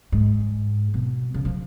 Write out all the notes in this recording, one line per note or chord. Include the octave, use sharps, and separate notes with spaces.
G#2
B2
C#3
F3